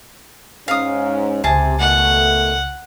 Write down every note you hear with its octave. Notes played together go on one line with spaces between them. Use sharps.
G#2 C#4 F5 D#6
C#2 C3 G#4 A5
B2 D#3 A3 F#5